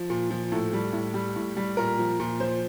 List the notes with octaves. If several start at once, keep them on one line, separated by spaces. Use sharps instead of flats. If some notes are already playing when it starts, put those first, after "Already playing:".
Already playing: F3
A#2
F3
A2 A4
G3
A2
G3
A2
G3
A#2 A#4
F3
A#2
F3 C5